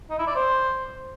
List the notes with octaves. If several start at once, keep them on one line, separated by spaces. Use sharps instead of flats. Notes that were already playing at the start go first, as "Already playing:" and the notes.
D#4
E4
D5
C5